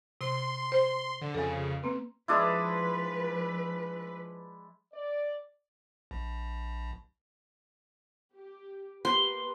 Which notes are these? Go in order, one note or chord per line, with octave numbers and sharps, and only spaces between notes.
C3 C6
C5
D3
F2 C#3 A4 G#5
A#3 C4 B4
F3 G#3 D4 E4 B4
D5
A#1
G4
A#3 G4 B4 C6